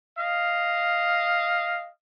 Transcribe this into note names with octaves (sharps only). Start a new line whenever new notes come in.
D#5 F5